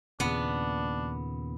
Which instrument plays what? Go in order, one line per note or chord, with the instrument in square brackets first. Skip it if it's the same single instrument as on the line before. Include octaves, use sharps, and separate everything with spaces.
[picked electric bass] D#2 A#2 C#3 [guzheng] B3 [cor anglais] D4